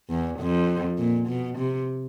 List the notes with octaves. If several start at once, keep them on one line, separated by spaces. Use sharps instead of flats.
E2
F2
A#2
B2
C3